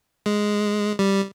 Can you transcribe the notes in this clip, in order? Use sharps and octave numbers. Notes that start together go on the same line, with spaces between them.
G#3
G3